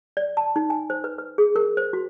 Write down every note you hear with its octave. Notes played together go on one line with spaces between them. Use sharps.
D5
A5
D#4
G#5
C5
B4
B4
G#4
A#4
C5
F#4